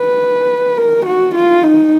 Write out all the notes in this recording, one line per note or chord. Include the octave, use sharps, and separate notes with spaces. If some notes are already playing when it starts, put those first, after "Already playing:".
Already playing: B4
A#4
F#4
F4
D#4